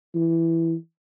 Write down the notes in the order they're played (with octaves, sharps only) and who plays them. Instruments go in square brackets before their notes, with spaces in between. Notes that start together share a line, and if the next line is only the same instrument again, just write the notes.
[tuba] E3